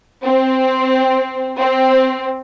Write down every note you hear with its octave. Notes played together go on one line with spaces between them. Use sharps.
C4
C4